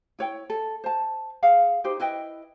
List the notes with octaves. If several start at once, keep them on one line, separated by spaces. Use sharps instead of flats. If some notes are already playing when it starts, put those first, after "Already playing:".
E4 C#5 G5
A4
C5 A5
G#4 F5 F#5
D#4 G4 C5
E4 B4 D#5 G5